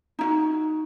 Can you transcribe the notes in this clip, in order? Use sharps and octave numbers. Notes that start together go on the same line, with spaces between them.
D#4 E4 F#4